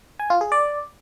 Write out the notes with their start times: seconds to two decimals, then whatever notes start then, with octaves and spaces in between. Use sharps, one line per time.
0.20 G#5
0.30 F4
0.41 G#4
0.52 D5